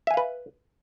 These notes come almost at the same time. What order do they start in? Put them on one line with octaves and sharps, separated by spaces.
E5 G#5 F5 B4